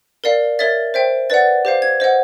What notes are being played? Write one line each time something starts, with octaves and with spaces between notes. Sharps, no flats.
A#4 D5 F5
A#4 C#5 E5 A6
C5 E5 G5
B4 D5 F#5 A6
G4 C5 F5
G#6
C5 D#5 F#5